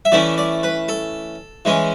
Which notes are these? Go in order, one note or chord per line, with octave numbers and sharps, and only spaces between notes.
E5
E3 A3 C#4 E4 D5
D5
B4
A4
E3 G#3 C#4